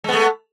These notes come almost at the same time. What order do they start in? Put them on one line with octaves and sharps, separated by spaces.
G#3 B3 A3